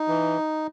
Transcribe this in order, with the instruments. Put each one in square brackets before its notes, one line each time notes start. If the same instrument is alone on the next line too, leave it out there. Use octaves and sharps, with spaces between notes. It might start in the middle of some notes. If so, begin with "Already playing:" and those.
Already playing: [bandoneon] D#4
E3